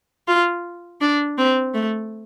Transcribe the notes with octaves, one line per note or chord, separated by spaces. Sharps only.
F4
D4
C4
A3